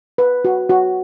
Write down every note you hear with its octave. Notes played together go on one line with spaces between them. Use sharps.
B4
F#4
F#4